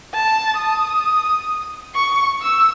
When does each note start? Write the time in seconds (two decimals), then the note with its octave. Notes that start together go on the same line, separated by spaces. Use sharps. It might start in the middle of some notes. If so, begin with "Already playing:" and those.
0.13 A5
0.57 D#6
1.95 C#6
2.42 E6